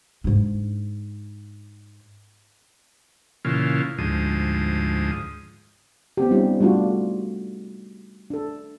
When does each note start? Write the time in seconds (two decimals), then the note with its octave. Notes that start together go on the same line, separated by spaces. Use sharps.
0.24 G#2 D4
3.45 A#2 C#3 E3 F4
3.98 D2 G#2 F3 D#6
6.17 B3 C4 G4
6.31 G3 C4 C#4 D#4 F4
6.60 G3 A3 D4 F4 F#4
8.30 D4 A4